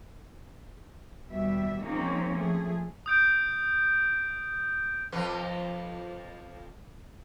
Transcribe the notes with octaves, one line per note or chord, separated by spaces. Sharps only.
D#2 B2 G3 E5
F3 G#3 A#3 C4 C#4 D#4
F3 A3 G#4
D#6 G6 D7
F2 F3 B4